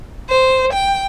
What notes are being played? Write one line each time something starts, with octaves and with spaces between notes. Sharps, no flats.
C5
G5